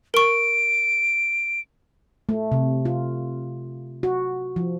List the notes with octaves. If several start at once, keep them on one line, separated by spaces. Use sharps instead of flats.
A#4 C#6 D7
A3
C3
F4
F#4
F3